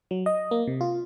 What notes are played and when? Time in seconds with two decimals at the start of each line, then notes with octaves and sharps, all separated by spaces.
0.11 F#3
0.26 D#5
0.51 A#3
0.67 C3
0.81 F4